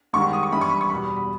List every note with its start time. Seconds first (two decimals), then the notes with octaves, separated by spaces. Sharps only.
0.13 G#2 D#3 G3 C#6
0.33 D#6
0.43 C#6
0.52 G2 E3 G3 B5
0.61 C#6
0.71 B5
0.81 C#6
0.90 E2 B2 G3 B5
1.16 B5